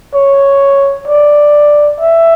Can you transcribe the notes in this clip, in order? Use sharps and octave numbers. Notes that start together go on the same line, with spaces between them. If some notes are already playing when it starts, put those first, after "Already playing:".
C#5
D5
E5